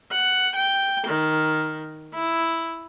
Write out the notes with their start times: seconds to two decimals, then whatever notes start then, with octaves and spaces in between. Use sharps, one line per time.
0.12 F#5
0.55 G5
1.07 D#3
2.14 E4